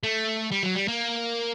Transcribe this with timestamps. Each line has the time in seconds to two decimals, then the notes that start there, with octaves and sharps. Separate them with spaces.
0.04 A3
0.51 G3
0.63 F#3
0.75 G3
0.88 A#3